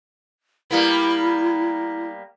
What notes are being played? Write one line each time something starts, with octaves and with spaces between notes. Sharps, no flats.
G3 A#3 B3 E4